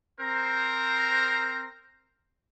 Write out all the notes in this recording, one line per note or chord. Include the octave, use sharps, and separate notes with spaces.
C4 A#4 C5 A#5